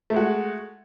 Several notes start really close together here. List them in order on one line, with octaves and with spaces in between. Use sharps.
A3 G#3 F#4